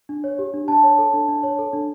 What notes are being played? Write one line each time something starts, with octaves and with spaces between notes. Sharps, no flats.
D4
C#5
G4
D4
D4 A5
C#5
A4
D4
D4
C#5
A4
D4